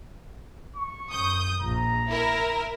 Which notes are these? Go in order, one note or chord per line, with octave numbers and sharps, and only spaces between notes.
C#6
F#2 D#6 G6
A#1 A#5
E4 A#4